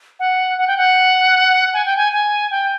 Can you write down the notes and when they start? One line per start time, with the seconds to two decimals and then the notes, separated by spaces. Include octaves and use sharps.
0.20 F#5
0.58 F#5
0.67 G5
0.77 F#5
1.74 G#5
1.86 G5
1.97 G#5
2.13 G#5
2.51 G5